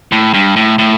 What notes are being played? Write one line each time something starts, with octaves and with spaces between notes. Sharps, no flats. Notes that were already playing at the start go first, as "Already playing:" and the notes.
A2
G2
A2
A2